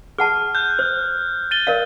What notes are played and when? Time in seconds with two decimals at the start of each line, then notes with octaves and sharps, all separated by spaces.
0.18 G#4 F#5 A5 F6
0.55 F#6 G6
0.79 C5
1.51 A6 D#7 G7
1.67 A#4 D5 F5